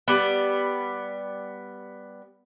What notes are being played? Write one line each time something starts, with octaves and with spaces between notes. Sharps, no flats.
G3 B3